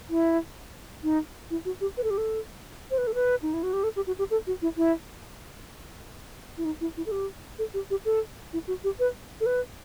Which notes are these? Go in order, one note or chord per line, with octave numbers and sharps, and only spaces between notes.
E4
D#4
E4
F#4
G4
B4
A4
G4
A4
C5
B4
A4
B4
D#4
E4
F#4
G4
A4
G4
F#4
G4
A4
F#4
E4
E4
E4
D#4
E4
E4
A4
G4
A4
G4
G4
A4
E4
F#4
G4
B4
A4
B4